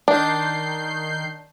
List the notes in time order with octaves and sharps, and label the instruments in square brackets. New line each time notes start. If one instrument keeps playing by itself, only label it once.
[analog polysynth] D#3 G6 C7 [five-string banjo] D4